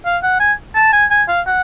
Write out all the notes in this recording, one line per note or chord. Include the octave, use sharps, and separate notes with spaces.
F5
F#5
G#5
A5
G#5
G#5
F5
F#5